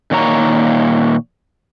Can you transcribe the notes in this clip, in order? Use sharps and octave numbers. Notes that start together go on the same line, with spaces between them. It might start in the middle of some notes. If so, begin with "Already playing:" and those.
A#2 D#3 A#3 C#5 A#5